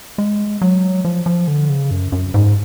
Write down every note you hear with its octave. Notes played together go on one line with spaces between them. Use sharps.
G#3
F#3
F3
F3
D3
C#3
F#2
F#2
G#2